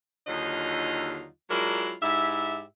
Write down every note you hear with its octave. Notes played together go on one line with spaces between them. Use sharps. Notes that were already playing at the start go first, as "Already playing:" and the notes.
D#2 D3 F#3 D#4 F4 D#5
F#3 G#3 D4 E4 F4 A#4
G#2 E4 G4 E5